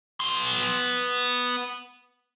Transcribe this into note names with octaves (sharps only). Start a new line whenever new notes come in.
B3 C6